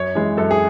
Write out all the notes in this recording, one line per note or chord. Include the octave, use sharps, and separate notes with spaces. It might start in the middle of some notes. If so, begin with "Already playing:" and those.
Already playing: F#2 C#5
E3 G#3
F#2 A4
G#4